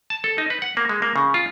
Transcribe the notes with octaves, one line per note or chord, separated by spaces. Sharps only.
A5
A4
D#4
B4
F#5
A#3
G#3
A#3
C#3
F4